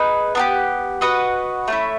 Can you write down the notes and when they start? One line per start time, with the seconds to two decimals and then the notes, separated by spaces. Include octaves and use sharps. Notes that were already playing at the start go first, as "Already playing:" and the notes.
Already playing: D#4 G#4 B4
0.35 B3 D4 G4
1.01 F#4 B4 D#5 F#5
1.68 A3 C#4 E4